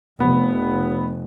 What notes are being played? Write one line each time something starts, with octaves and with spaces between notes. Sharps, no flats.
F1 B3